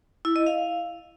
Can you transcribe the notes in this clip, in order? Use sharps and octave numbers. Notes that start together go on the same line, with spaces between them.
E4
D#5
F5